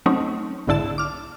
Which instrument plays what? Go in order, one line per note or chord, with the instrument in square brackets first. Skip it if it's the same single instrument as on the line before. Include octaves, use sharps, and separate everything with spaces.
[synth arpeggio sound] F#3 A3 C4 C#4 D#4
B1 G#2 D3 E4 A5 E7
D6 F6